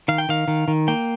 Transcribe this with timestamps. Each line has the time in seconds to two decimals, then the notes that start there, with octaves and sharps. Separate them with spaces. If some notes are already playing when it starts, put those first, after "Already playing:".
0.08 D#3 F5
0.18 G5
0.29 D#3 F5
0.48 D#3
0.68 D#3
0.88 A#3 G5